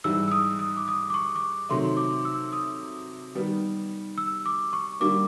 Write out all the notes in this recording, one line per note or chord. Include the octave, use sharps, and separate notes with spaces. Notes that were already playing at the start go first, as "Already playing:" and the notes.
G#2 E3 G3 E6
E6
D#6
D#6
D6
D#6
D6
C#6
D6
C#6
C3 D#3 F#3 A3 C6
D6
E6
D#6
D#3 G3 B3
E6
D6
C#6
D3 G3 A#3 D6